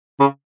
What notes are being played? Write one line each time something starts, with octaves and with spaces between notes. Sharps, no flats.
C#3